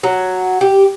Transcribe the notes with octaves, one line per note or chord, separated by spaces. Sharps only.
F#3
G4